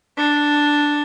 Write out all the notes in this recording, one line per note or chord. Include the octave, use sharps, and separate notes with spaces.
D4